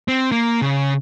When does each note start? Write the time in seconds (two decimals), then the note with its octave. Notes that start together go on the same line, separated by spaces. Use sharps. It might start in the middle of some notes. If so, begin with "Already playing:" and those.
0.08 C4
0.32 A#3
0.62 C#3